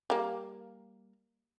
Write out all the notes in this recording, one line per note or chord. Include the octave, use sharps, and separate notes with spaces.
G3 A#3